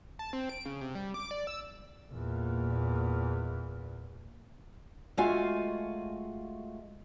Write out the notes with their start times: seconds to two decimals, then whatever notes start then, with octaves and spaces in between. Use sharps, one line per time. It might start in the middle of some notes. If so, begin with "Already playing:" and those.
0.19 A5
0.33 C4
0.49 D7
0.66 C#3
0.81 C3
0.95 G3
1.14 D6
1.31 D5
1.47 E6
2.12 E2 A#2
5.17 G#3 A3 F4 F#4 F5 G#5